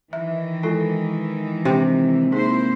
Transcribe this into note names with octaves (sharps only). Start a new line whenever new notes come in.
D#3 E3 E5
G#3 E4 F4 A4
C3 D4 C5
A#3 C4 D#4 E4 G#4 C5